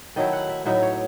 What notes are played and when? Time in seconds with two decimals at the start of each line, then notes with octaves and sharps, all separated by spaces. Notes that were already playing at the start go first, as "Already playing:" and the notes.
0.16 D#3 F#3 A3 E4 D#5
0.33 F#5
0.49 E5
0.65 A2 F#3 B3 D#4 E5
0.82 C#5